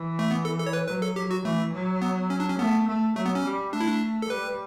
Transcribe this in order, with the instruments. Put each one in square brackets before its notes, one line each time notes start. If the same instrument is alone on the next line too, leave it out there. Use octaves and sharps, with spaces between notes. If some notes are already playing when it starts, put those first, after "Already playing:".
Already playing: [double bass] E3
[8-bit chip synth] A3
B3
A4
A4
C#5
B4
[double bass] F#3 [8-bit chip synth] B4
[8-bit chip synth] A4
[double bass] F#3 [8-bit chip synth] G4
[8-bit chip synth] F#4
[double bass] E3 [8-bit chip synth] A3
[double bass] F#3
[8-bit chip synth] B3
C#4
D4
C#4
[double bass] A3 [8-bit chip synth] B3
[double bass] A3
[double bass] F#3 [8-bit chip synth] A3
[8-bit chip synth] B3
C#4
[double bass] G3
[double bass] A3 [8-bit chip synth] D4
[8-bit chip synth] E4
D4
A4
[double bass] G3 [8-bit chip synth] B4